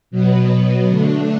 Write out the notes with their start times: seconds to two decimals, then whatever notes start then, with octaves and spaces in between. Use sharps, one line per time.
0.11 B2 F#3 B3
0.89 D3 A3 D4